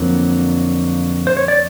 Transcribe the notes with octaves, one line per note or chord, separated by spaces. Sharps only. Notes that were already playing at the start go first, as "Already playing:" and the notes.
Already playing: F2 D3 F#3 A#3
C5
C#5
D5